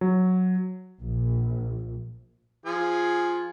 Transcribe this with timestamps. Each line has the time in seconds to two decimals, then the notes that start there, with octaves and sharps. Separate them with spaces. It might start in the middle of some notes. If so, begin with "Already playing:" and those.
0.01 F#3
1.01 A#1
2.66 F3 G#4 G#5